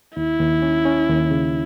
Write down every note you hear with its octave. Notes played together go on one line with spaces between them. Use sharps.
D#2 E4
D#2
C#4
C#4
D#2
C#3